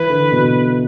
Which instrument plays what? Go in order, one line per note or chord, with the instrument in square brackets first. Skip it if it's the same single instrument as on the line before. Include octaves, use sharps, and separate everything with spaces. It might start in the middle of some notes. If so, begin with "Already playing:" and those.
Already playing: [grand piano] E3 [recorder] B4
[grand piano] D3
B2